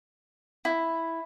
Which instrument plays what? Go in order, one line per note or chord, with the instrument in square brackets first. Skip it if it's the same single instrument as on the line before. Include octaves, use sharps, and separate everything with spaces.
[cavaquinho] E4